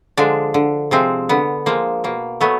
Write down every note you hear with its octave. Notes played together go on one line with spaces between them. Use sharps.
D3 F3 G#3 D4
D3
C3 F3 G#3 C4
D3 B3
F3 G#3 A#3
B2 A#3
F#3 A3 B3